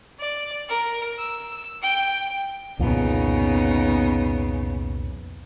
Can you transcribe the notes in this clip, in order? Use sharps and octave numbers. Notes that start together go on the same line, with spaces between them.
D5
A#4
E6
G5
C2 F2 A#2 C#3 B3 D#4